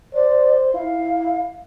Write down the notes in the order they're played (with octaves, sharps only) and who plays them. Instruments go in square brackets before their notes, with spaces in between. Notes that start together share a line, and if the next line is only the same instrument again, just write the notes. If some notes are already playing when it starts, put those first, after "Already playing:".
[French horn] C5 [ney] D5
[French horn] E4 [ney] F5